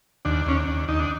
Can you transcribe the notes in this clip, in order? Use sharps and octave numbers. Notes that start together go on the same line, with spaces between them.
D#2 D4
D#2 C#4
D4
D#2
D#2 D#4
D4